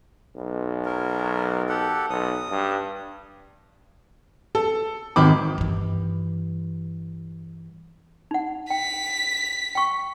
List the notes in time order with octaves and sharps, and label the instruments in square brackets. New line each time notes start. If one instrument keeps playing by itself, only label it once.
[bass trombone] B1
[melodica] F#3 A#4
G4 A4 F#5
[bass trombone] B1 [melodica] D#6
[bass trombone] G2
[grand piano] A4
G#1 D#3 B5 D6
[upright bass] G2 E3
[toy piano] D#4 F#5
[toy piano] G5 [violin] B6
[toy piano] G5 C#6